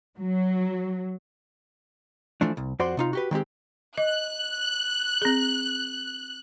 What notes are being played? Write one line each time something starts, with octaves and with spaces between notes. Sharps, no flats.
F#3
E3 F3 A3 D4
C2
F2 F#4 C5 D5 C6
C3 D#4 F4
F#4 G4 B4
D#3 G#3 C4 G4
D#5 F#6
C4 G#4